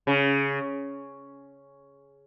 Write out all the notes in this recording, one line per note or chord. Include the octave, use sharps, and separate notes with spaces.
C#3